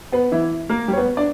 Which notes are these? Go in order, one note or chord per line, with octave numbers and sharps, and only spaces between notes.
B3 B4
E3 E4
A#3 A#4
G3 G4
C#5
B3 B4
D4 D5